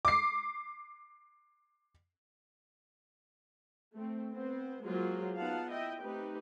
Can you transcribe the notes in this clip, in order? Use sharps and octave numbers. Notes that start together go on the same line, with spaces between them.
D6 C7
A3 C4
B3 C4 C5
F#3 G#3 A#3 F4 G#4 C5
B3 D#4 F4 F5 F#5 A5
E4 D#5 E5 G5
A3 C4 D#4 G4 B4